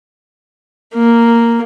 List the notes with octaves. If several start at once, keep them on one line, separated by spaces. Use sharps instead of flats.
A#3